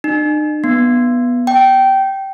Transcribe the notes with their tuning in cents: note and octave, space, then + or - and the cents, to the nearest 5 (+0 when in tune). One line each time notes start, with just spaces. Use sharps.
D#4 -45
B3 -10
G5 -15